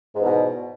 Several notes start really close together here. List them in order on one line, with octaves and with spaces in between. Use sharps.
G#2 E2 B2